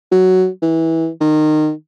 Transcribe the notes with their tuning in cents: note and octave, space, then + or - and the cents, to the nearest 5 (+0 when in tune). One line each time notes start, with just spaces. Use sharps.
F#3 +5
E3 -20
D#3 -20